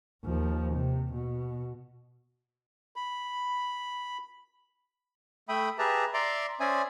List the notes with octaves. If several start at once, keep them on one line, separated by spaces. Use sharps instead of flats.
D#2 F3
C3
B2
B5
A3 E5 G5 B5 D#6
G4 G#4 B4 E5 A5 A#5
D5 E5 A#5 C6 D6
C#4 C5 D5 E5 G#5 D#6